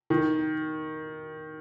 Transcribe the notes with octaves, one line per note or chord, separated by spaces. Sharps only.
D#3